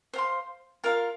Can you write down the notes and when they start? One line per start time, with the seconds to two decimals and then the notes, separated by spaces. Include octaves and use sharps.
0.13 C5 F5 C6
0.84 F4 A#4 F5